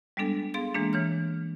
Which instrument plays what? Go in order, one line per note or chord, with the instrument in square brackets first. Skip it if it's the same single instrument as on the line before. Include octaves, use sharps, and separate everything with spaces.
[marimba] G3 G#3 B3 D4 A4
B3 G#4 F5 C6 A6
E3 G#3 A#3 D4
E3 C#5 F6